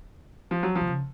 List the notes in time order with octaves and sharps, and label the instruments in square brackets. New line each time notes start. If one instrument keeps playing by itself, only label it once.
[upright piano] F3
F#3
F3
[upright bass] C3
C#3